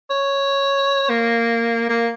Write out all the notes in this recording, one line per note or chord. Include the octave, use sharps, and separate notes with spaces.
C#5
A#3
A#3